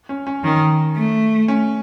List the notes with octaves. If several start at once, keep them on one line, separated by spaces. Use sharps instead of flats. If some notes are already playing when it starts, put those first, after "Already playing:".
C#4
C#4
D#3 C#4
A3
C#4